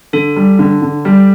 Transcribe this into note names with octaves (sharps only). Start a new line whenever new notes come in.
D3 A4
G3
D3
D3
G3